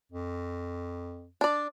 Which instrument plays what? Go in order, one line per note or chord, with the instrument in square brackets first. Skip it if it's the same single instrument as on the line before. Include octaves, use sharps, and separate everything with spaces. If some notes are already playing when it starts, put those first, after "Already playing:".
[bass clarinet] F2
[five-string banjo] D4 D5